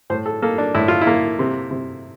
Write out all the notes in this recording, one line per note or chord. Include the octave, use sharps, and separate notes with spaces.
A2 C5
A4
A#3 A4
D4
A2 E4
F4
E4
A#3
C3
C3